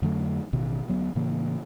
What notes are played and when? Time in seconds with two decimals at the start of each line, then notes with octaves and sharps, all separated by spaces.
0.02 F2 D3 F#3 A3
0.53 A1 B2 D#3
0.88 D2 F#3 B3
1.15 A2 C#3 E3 A#3